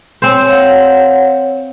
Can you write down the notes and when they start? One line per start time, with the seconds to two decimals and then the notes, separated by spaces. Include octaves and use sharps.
0.22 C4 C5 C#5 G#5
0.47 C#5 F5 F#5